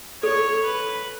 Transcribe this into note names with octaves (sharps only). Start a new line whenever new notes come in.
A4 C#5
B4